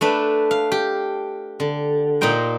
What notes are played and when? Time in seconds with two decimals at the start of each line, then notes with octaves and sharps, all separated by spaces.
0.01 A3 D4 B4
0.51 F5
0.72 G4
1.60 D3
2.21 A#2 D#4 C5 G5 A#5